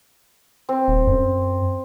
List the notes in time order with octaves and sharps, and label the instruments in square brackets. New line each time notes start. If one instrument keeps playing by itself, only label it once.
[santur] C4
[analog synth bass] D#1
F#2